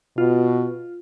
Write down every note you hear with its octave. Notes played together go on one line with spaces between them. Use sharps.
B2 F4